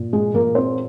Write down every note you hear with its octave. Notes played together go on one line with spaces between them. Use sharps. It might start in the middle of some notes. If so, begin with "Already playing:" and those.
Already playing: A#2
G#3 G#4
A#2 A#3 A#4
C4 C5